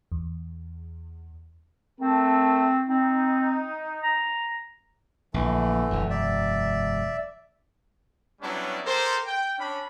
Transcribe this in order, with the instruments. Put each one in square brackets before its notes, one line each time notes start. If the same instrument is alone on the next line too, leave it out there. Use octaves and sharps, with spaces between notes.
[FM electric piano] E2
[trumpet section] A3 A#4 A5 [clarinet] C4
[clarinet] C4 [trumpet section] D#4
[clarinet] A#5
[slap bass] A#1 [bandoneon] D3 E3 A3
[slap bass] E1 F#2
[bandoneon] D5 E5
[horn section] F#3 G3 B3 C#4 D4 E4
G4 A4 A#4 C5
G5
C#4 D4 B5